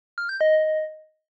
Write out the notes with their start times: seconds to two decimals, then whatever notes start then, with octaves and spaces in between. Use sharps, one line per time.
0.18 F6
0.29 G6
0.41 D#5